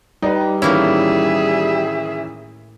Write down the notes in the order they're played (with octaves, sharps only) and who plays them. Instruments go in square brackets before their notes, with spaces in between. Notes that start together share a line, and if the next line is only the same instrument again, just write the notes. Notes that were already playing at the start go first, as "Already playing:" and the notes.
[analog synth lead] G3 [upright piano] D#4 B4
[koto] A2 A#3 E4 [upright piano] D#3 E3 C#4 [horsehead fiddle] G#4 E5